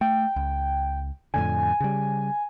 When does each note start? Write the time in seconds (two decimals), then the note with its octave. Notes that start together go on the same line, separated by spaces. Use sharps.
0.01 A3 G5
0.36 C#2
1.34 F2 A2 D3 G#5
1.80 C#3 G3